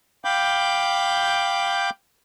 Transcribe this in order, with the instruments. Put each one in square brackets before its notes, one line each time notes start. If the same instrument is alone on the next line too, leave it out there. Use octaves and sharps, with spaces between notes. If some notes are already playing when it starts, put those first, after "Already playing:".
[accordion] F5 G5 B5 D6 G6